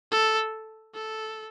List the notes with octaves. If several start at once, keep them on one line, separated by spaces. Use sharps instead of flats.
A4
A4